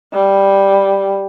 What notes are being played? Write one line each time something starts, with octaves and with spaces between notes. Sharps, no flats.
G3